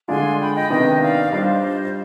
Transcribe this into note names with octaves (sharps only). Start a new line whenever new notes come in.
D3 G#3 D4 F4 G#5 C6
G5 B5
D#5 G5
C3 D#3 B3 D4 D#5 G5
G5
D5 F5
G3 D4 F4 C5 D#5